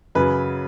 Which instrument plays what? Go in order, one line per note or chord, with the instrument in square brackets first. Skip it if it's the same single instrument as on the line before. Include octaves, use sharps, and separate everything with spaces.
[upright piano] F#2 C#3 F#3 B4